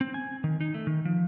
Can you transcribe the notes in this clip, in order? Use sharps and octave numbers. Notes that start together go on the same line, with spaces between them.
C4
G#5
D#3
D#4
A3
D#3
F3